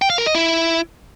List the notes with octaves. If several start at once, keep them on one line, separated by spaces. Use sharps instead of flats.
G5
F5
A#4
D#5
E4